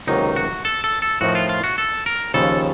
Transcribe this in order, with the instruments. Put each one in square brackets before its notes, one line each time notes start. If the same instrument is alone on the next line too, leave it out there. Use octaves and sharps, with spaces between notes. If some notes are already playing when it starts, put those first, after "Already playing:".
[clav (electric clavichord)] C#2 C3 D#3 F#3 A#3 [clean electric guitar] D#4
[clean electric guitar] F#4
A4
A4
A4
[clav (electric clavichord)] A2 F3 A3 D#4 A#4 [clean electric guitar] F#4
[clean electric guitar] F4
F4
F#4
A4
A#4
[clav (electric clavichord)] D#2 C#3 F3 [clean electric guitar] A4